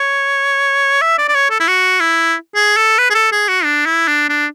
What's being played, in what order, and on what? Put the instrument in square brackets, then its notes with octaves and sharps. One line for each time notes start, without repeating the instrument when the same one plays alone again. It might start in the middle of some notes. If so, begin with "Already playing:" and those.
Already playing: [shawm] C#5
E5
D5
D5
C#5
A4
E4
F#4
E4
G#4
A4
B4
G#4
A4
G#4
F#4
D4
E4
D4
D4